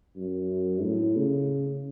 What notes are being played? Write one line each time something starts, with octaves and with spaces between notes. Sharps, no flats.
F#2
A2
C#3